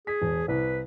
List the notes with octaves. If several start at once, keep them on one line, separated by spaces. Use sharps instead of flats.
G#4 B6
E1
C2 B4